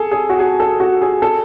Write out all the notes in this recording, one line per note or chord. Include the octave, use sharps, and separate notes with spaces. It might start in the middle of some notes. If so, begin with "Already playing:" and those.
Already playing: G#4 A4
G#4
F#4
G#4
A4
F#4
G#4
A4